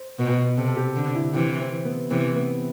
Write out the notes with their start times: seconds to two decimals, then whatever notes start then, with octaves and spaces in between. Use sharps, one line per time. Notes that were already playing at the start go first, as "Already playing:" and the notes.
Already playing: C5
0.19 B2 B4
0.57 C3 A4
0.68 A4
0.76 G4
0.96 D3
1.15 E4
1.34 C3 E3 E4
1.60 C4
1.85 B3
2.10 C3 E3 B3
2.36 B3